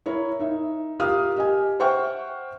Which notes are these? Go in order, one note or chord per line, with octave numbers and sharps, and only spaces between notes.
E4 A#4 C#5
D#4 E5
F4 G4 A#4 F5 D#6 F6
G4 D#5 G#5
C5 E5 F#5 G5 C#6 F6